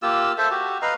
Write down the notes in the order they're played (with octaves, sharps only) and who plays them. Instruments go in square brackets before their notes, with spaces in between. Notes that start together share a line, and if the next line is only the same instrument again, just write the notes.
[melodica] A#3 F4 G4 E6
A4 C5 E5
F#4 G4
B4 D#5 F5 A#5